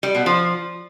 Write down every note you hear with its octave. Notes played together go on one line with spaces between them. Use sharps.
G3
B2
F3